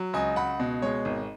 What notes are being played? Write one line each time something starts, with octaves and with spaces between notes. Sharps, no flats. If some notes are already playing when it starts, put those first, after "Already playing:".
Already playing: F#3
C#2 D#5 G#5
C#2 F#5 B5
B2
G#3 C#5
G#1